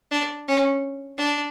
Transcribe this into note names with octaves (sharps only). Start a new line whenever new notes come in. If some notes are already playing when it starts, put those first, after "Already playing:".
D4
C#4
D4